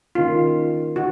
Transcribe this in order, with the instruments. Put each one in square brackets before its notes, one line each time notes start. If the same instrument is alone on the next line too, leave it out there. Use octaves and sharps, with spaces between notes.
[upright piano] D#3 A#3 C#4 [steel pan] F4
[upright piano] D#3 [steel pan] F#4